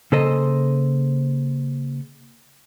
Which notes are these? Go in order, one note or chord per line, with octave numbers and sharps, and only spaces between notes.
C#3 A#3 A4 C5 D#5